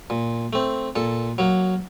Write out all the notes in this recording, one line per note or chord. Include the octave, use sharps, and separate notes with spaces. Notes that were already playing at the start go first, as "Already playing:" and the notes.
A#2
A3 C4
A#2 A4
F#3 A#3